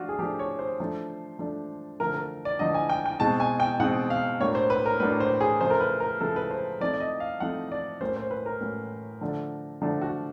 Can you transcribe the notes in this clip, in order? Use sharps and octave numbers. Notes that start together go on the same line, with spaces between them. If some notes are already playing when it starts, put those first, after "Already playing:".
Already playing: F3 A3 D4 F4 F#4
G#4
F3 A3 D4 G4
C#5
C5
F3 A3 D4
F3 A3 D4
D3 F3 A3 A#4
A#4
D5
D3 F3 A3 D#5
G#5
G5
G5
B2 G#3 C4 D#4 A5
G#5
G5
B2 G#3 C4 D#4 F#5
F5
A2 F#3 A#3 D4 C#5
C5
B4
A#4
A2 F#3 A#3 D4 B4
C5
G#4
C#3 F3 A3 C5
A#4
B4
A#4
C#3 F3 A3 A4
B4
C5
F3 A3 C4 D#4 D5
D5
D#5
F5
F3 A3 C4 D#4 F#5
D5
A2 F#3 A#3 C#4 C5
C5
B4
A#4
A2 F#3 A#3 C#4
D3 F3 A3 D4
D3 F3 A3 D4
F#4